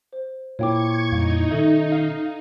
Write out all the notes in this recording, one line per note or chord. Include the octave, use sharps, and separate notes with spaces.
C5
A#2 A#3 E4 C#5 G5 C#6 D6 G#6
F2 G3 D#4 F5
B2 D#3 C#4 A4 E5
F5